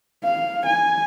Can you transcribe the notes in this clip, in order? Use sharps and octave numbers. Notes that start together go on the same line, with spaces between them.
F5
G#5